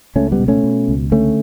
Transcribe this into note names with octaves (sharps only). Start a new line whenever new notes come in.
C#2 A3 C#4
G3 B3
B2
A3 C#4
B2
C#2
D3 A3 C#4